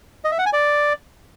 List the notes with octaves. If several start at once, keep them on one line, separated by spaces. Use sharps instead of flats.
D#5
E5
F#5
G#5
D5